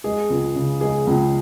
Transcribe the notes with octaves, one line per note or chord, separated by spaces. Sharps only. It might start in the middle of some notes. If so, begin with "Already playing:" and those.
G#3 G#4
C#2
C#3
G#3 G#4
C#2